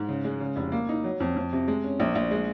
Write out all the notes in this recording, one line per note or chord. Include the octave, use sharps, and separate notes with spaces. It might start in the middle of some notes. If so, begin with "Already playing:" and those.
Already playing: G#2
C#3
G#3
C#3
F1
A#3
D#4
F#3
F2
F2
C3
G#3
C#4
A#1
A#1
G#3